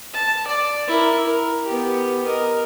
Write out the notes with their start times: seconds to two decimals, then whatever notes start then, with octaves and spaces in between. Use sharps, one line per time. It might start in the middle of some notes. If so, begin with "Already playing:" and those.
0.14 A5
0.47 D5
0.88 E4 A#4
1.27 A#4
1.66 B3 G4
2.26 A#4 D#5